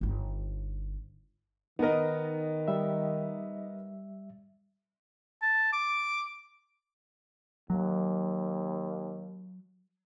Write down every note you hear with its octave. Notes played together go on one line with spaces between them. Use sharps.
G1 D#4
D#3 B3 D#4 A#4 D#5
G3 E5
A5
D6
D#2 F#3